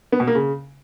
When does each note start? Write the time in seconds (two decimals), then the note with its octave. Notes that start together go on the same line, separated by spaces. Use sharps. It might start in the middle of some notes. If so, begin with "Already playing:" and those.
0.12 B3
0.20 B2
0.27 A#3
0.35 C#3